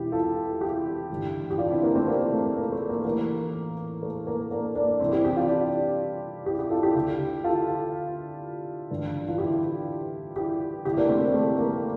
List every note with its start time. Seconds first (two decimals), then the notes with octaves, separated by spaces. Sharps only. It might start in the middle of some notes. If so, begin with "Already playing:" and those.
Already playing: E1 C3 E3 E4 G4
0.12 F4 A4
0.61 E4 G4
1.10 A1 G2 D3
1.50 G4
1.58 D4 F4
1.71 C4 E4
1.83 A#3 D4
1.95 A3 C4
2.08 A#3
2.32 A3
2.57 A#3
2.72 A3
2.89 A#3
3.04 A1 A2 E3 A#3
4.03 A3
4.27 A#3
4.51 A#3 D4
4.75 A#3 D4
4.99 C2 C3 E3 C4 E4
5.12 E4 G4
5.24 E4 G4
5.36 D4 F4
5.48 D4 F4
6.46 E4 G4
6.59 E4 G4
6.70 F4 A4
6.83 E4 G4
6.95 D2 D3
7.44 F4 A4
8.91 A1 G2 D3
9.28 F4
9.38 E4 G4
10.36 E4 G4
10.85 F1 F2 D3 E4 G4
10.97 A#3 D4
11.09 A3 C4
11.21 A#3
11.34 A3
11.58 A#3